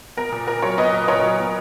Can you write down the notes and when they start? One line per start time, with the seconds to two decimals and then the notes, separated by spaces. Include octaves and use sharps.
0.17 B3 A#4
0.32 A#2
0.48 A#2 A#4
0.62 F#3 A#4 C#5
0.78 B3 B4 D#5
0.93 A#2
1.08 A#2 A#4 C#5
1.23 F#3
1.39 B3